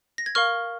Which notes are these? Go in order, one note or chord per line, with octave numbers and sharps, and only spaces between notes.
A#6
G#6
A#4 F5 C#6 F6